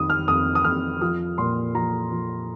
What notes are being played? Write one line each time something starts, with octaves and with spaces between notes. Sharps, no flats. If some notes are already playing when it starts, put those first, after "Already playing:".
Already playing: F2 D#3 D#6
F6
F2 D#6
D#6
F2 F6
F3 D#6
A#2 C6
F3 A#5
F3